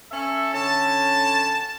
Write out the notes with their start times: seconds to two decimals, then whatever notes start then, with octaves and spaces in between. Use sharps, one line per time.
0.12 C#4 A4 E5
0.54 D3 C#4 A5